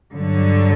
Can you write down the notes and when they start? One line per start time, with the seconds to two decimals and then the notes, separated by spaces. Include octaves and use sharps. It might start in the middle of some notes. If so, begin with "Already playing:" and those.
0.13 G2 D3 F#3